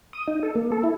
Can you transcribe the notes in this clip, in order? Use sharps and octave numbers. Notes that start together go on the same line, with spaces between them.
D#6
D#4
A4
A#3
A4
E4